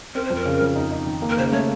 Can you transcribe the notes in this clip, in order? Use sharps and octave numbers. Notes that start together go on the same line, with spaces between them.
C4 A#4
C5
F2
A#4
C#3
F2
D#4
D#4
D#3
A#3
A#4
C#3 C5
A3 C#5